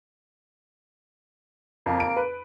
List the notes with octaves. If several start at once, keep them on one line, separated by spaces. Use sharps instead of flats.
F2 A#3
D7
B4